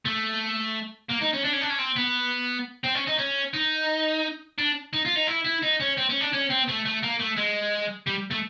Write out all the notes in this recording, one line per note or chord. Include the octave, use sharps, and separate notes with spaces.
A3
A#3
D#4
C#4
D4
C#4
D4
C#4
C4
B3
C4
C#4
D#4
C#4
D#4
D4
D#4
F4
D#4
E4
E4
D#4
C#4
C4
C#4
D4
C#4
C4
A3
A3
A#3
A3
G#3
G3
A3